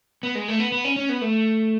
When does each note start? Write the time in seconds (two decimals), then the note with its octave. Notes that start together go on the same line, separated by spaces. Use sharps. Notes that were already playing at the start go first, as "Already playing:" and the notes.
0.23 B3
0.35 G#3
0.48 A3
0.60 B3
0.72 B3
0.84 C#4
0.96 C#4
1.09 B3
1.21 A3